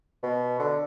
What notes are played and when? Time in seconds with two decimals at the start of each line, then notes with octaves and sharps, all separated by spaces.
0.23 B2
0.59 D3